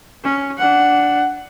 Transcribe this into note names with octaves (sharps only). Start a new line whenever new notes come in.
C#4
D4 F#5